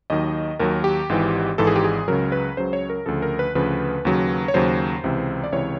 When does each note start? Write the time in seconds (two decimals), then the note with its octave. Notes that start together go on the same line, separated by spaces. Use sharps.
0.10 D#2 D#3 F#3 D#5
0.59 D#2 D#3 F#3 A#4
0.84 G4
1.09 G#1 G#2 E3
1.58 G#1 G#2 E3 A4
1.67 G#4
1.76 G4
1.84 G#4
2.08 C#2 C#3 F#3 A#4
2.32 B4
2.57 C#2 C#3 F#3 C5
2.73 C#5
2.90 A#4
3.06 D2 C#3 F3 A4
3.22 A#4
3.39 B4
3.55 D2 C#3 F3 B4
4.05 D#2 C#3 F#3
4.48 C#5
4.54 D#2 C#3 F#3 C5
5.04 C#2 C3 E3
5.44 D5
5.52 C#2 C3 E3 C#5